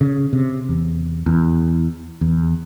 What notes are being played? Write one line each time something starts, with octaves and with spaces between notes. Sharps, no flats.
C#3
C3
E2
E2
E2